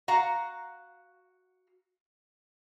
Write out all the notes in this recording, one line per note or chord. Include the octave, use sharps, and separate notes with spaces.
F#4 F5 F#5 A#5